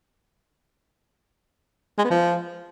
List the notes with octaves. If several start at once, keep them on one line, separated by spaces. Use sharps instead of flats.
G#3
B3
F3